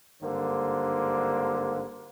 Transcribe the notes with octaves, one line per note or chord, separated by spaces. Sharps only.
G#1 G2 D3 A#3 C5